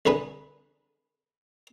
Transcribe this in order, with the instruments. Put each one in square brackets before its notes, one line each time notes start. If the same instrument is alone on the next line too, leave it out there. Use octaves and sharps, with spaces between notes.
[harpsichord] C2 D3 G#4 B4 A5 D#6